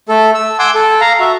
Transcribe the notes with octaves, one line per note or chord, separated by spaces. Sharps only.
A3 A4
E6
F#5 G#5 C6 D6 E6
A4
F5 A#5
F#4 E5